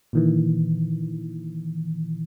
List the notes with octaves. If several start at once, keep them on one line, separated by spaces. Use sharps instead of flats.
A#2 D#3 E3